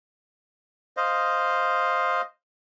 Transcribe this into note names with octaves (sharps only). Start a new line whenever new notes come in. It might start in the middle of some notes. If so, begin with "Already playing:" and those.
C5 D#5 F5